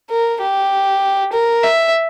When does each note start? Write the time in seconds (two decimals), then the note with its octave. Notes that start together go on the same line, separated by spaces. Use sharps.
0.10 A#4
0.41 G4
1.33 A#4
1.63 E5